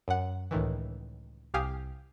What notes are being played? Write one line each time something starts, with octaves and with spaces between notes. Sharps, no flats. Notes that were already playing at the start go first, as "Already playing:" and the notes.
F#2 F#5
C#2 A2 D#3 E3
C2 G4 F5 G#5 D#6